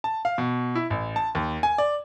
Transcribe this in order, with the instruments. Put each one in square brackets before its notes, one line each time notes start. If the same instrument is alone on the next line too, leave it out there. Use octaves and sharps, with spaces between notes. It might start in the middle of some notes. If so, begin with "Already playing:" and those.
[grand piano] A5
F5
B2
E4
A1
A5
D#2
G#5
D5